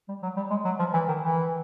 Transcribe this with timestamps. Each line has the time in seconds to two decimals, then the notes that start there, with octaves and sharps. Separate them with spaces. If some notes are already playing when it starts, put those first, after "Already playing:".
0.09 G3
0.23 F#3
0.37 G3
0.50 G#3
0.65 F#3
0.79 F3
0.94 E3
1.08 D#3
1.22 E3